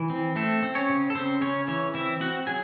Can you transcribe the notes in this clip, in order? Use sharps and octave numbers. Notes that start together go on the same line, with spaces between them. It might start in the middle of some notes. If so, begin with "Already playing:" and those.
Already playing: E3
C4
A3 C4 A4
C4
C#4 C#5
C#3
A4
C#3 C4 C5
C#3 C#4 C#5
E3 C#4 C#5
C4 E4 E5
C4 F#4 F#5
F#3 G#4 G#5